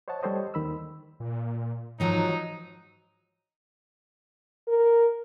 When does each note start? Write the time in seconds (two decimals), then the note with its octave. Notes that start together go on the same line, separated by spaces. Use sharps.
0.08 C5 C#5 D#5 F#5 A5
0.23 G3 G4 A4 C5 C#5 D#5
0.54 D#2 D#3 B5 E6
1.20 A#2
2.00 G#2 D#3 F3 F#3 D#4 F#4
4.67 A#4